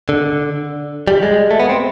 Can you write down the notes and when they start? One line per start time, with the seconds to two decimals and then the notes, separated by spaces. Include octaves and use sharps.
0.09 D3
1.08 G3
1.23 G#3
1.51 A3
1.59 B3
1.69 C4